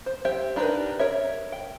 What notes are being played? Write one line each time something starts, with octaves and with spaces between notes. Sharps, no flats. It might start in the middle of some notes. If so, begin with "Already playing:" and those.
C5
G4 C5 E5 G5
D4 D#4 G4 A#4 B4
A#4 C#5 E5
G5